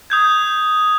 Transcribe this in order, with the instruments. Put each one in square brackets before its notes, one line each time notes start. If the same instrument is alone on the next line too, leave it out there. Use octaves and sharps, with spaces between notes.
[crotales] D#6 G6 G#6